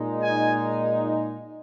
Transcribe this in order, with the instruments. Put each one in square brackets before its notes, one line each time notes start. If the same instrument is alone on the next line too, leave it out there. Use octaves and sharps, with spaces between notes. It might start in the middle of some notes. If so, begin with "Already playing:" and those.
Already playing: [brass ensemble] A#2 G#3 D#4
G#5